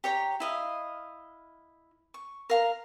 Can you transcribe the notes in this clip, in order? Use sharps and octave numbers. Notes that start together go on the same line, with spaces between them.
G4 C#5 A#5
E4 D#5 F5
C#6
A#4 F5 A#5